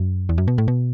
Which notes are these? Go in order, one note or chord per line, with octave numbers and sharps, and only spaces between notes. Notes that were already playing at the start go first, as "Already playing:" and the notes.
Already playing: F#2
E2
F#2
B2
A2
B2